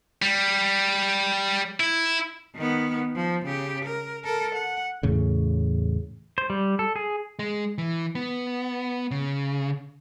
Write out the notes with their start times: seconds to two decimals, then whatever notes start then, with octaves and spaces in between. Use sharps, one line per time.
0.22 G3
1.80 E4
2.56 D#3 B3
3.16 F3
3.45 C#3 G4
3.85 A#4
4.24 A4 A#4
4.55 F#5
5.03 E2 A2 C#3
6.38 C5
6.50 G3
6.79 A4
6.96 G#4
7.39 G#3
7.78 E3
8.15 B3
9.11 C#3